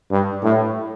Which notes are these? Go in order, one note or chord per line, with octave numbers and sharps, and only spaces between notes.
G2
A2